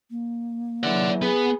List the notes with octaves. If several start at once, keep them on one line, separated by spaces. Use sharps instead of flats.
A#3
C#3 E3 F#3 D5 F#5
B3 G#4